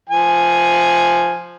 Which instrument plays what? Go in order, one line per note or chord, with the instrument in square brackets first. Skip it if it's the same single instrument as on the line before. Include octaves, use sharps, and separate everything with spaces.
[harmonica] F3 G#5